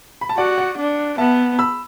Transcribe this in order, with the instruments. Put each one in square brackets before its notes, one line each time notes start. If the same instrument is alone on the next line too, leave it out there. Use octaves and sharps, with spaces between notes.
[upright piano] B5
A5
[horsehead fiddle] F#4 [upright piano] D5 F#5
[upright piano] D5 F#5
[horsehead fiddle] D4
[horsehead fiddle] B3 [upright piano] E5 A5
[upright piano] B5 E6